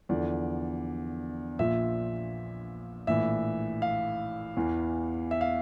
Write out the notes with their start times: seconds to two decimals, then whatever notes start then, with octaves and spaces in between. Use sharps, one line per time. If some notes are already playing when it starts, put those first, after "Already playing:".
0.09 E2 D3 F3 D5
1.59 A#1 A#2 F3 E5
3.07 A#1 A2 E3 E5
3.82 F5
4.57 E2 E3
5.31 E5
5.41 F5